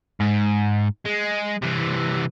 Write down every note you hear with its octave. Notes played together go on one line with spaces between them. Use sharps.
G#2
G#3
C3 E3